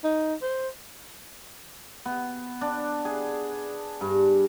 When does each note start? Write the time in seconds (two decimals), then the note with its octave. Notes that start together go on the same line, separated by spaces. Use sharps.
0.04 D#4
0.42 C5
2.06 B3
2.61 D4
3.05 G#4
4.01 G2